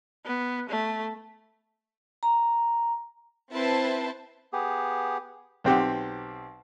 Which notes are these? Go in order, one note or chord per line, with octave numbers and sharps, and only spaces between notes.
B3
A3
A#5
C4 E4 B4 C5 A5
B3 G4 G#4
B1 C4 G4 F#5